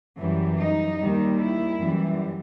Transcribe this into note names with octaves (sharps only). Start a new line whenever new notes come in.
F#2 E3 G3
D#4
D#2 D#3 G3
E4
F#2 E3 G3